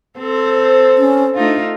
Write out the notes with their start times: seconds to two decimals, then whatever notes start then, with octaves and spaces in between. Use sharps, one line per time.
0.18 C4 A4 C5
0.98 C#4
1.35 A3 D4 D#4 F4